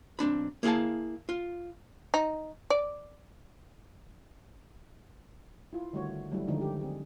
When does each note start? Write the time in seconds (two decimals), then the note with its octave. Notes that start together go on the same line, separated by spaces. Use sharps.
0.19 B1 C4 D4 B5
0.63 A#3 E4 G#4 F5 A5
1.29 F4
2.14 D#4
2.70 D5
5.73 E4 F4
5.93 D3 D#3 G3 A3 F#4 C#5
6.32 F#3 G3 A3 E4
6.47 D3 D#3 F3 G#3 D#4
6.61 G4
6.81 C4 G#4